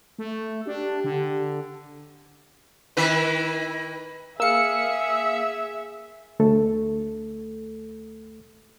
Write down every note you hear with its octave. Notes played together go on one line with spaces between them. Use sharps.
A3
D4 G4
D3
D#3 E4 B4
A#3 G#4 E5 F5 E6 C#7
D2 A3 A4